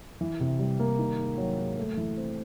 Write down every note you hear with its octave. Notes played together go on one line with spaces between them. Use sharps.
E3
C3
G3
A#3
D#3
G#2
F#3
G#2
A3
E3
C4